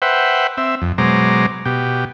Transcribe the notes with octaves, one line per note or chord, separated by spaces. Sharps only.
B4 C5 E5 F#5 G5
C4 E5
F2
B2 F#3 G#3 C5 A#5 D6
B2 G4